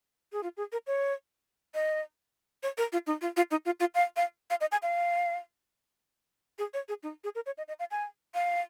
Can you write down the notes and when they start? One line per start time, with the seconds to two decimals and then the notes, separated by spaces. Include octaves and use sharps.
0.32 G#4
0.43 F4
0.57 G#4
0.72 A#4
0.87 C#5
1.75 D#5
2.63 C#5
2.78 A#4
2.92 F4
3.07 D#4
3.22 F4
3.37 F4
3.51 D#4
3.65 F4
3.80 F4
3.95 F5
4.17 F5
4.50 F5
4.61 D#5
4.72 G#5
4.83 F5
6.59 G#4
6.74 C#5
6.88 G#4
7.03 D#4
7.24 G#4
7.35 A#4
7.46 C#5
7.58 D#5
7.68 D#5
7.79 F5
7.91 G#5
8.35 F5